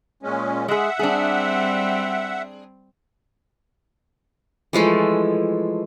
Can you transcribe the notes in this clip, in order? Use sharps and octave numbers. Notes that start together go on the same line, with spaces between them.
A#2 G#3 C#4
G#3 G#4 E5 F#5
G3 C4 D4 G#4
E3 F3 G#3 A3